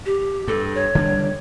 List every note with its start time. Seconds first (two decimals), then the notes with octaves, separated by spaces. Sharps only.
0.06 G4
0.48 G2 A4
0.75 C#5
0.95 D3 G3 D4